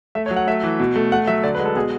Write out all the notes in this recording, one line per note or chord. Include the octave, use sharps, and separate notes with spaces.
A3 E5
C#5
F#3
F#5
A3 E5
E3
B2
A3
A3 F#5
F#3 E5
D3 D5
B4
G#3
A4
B2 G#4